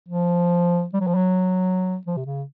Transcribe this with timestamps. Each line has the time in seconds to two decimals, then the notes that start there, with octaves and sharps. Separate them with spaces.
0.08 F3
0.94 G3
1.00 F#3
1.07 F3
1.15 F#3
2.07 F3
2.17 C3
2.26 C#3